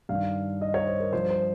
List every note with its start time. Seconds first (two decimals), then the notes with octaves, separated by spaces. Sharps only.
0.09 G2 D#3 F5
0.61 D#5
0.74 C#5
0.87 C5
1.00 A#4
1.13 G2 F3 C5
1.30 C5